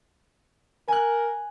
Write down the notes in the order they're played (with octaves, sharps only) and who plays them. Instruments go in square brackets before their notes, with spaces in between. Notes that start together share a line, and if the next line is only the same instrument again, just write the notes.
[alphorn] A#4 [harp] G#5 F#6